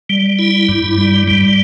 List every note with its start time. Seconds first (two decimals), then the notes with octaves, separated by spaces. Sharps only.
0.10 G3
0.39 E4
0.69 G2
0.98 G3
1.28 G3